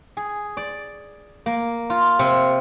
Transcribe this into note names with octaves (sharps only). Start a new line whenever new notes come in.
G#4
D5
A#3
F4
C3